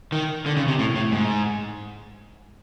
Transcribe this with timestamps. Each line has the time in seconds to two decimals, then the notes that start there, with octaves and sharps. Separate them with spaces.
0.12 D#3
0.46 D3
0.57 C#3
0.68 C3
0.79 A2
0.96 A2
1.12 G#2